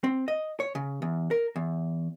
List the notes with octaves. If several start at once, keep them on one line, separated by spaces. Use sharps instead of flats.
C4
D#5
C#5
C#3
E2
A#4
E2